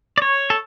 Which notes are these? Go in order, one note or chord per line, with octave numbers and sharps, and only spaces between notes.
D5
C#5
A4